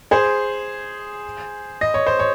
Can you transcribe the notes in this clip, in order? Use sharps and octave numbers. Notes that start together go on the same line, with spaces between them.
G#4 C5
D#5
C#5
C5
C#5